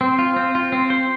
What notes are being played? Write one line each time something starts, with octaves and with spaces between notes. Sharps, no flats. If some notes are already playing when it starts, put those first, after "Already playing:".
C4
F4
C4
F4
C4
C5